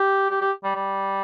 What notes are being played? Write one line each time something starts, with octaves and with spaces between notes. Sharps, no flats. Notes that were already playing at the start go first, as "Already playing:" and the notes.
Already playing: G4
G4
G4
G3
G3